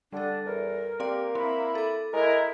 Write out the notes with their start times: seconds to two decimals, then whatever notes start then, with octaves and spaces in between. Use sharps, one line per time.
0.12 D3 G3 D4 A4
0.46 E2 A#4
1.00 A#3 C4 G4 D5
1.35 C4 E4 B5
1.75 A4 D6
2.13 G#3 E4 A#4